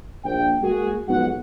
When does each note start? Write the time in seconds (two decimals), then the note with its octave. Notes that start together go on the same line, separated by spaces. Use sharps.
0.25 A#1 G5
0.62 G#3 A#3 F#4 G#4
1.08 B1 G#2 F3 B3 F#4 F#5